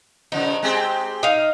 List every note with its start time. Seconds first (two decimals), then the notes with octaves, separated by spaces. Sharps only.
0.32 G2 C#3 F3 D#4
0.63 G#3 C4 G4
1.23 D#4 F5